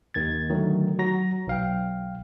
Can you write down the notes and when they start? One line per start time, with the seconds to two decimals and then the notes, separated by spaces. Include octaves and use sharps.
0.14 D#2 D#3 G#6 A6
0.50 D3 D#3 F#3 A3
0.99 F#3 F#4 A#5 A#6
1.47 B1 F5 G5